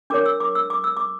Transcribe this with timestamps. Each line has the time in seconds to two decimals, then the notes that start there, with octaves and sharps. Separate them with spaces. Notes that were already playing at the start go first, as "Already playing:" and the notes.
0.10 D4 A#4 C#5 D6
0.26 E6
0.40 D6
0.55 E6
0.70 D6
0.84 E6
0.97 D6